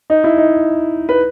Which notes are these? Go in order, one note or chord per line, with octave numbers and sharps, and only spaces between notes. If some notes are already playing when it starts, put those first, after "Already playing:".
D#4
E4
D#4
B4